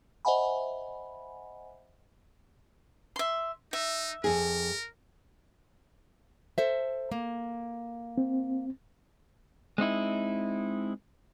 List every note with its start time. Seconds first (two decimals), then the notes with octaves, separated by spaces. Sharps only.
0.25 C5 D#5 E5 F#5 G#5 B5
3.16 E5 C6
3.73 D#4 E5
4.24 F2 G#4 A#4
6.58 A4 C5 E5
7.11 A#3
8.18 C4
9.78 G#3 C4 D#4 E4